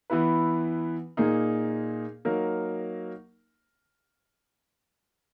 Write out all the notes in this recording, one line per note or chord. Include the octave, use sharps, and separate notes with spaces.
E3 B3 E4 B4
A#2 A#3 D#4 G#4
F#3 A#3 D#4 A#4